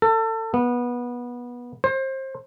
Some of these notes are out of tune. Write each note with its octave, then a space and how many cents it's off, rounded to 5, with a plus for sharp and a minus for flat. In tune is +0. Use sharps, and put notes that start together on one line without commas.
A4 +30
B3 -20
C5 +30